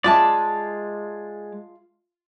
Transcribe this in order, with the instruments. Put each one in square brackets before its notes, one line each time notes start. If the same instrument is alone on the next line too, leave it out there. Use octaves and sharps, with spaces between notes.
[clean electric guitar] G#3 D5 [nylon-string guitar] F4 E5 A5